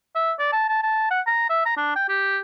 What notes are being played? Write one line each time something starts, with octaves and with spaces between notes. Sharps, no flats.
E5
D5
A5
A5
A5
F#5
A#5
E5
A#5
D4
G5
G4